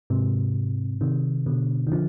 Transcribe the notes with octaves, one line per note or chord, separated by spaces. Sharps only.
G#2 C3
C3 D#3
B2 D3
D#3
D3 F3